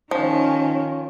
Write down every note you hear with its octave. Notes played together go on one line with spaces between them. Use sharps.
D#3 F3 C#4